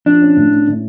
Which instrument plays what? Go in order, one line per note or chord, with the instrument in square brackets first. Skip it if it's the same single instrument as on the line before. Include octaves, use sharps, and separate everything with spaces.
[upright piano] F3 [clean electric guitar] D4
[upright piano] C#4
A2
C#4
A2